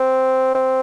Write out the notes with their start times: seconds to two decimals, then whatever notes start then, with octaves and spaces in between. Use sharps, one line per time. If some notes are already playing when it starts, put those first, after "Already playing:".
Already playing: C4
0.55 C4